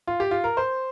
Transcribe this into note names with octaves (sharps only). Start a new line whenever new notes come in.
F4
G4
F4
A#4
C5